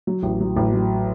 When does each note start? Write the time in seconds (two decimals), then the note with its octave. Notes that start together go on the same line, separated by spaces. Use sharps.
0.07 F#3
0.23 A1
0.41 F#3
0.56 A1
0.73 F#3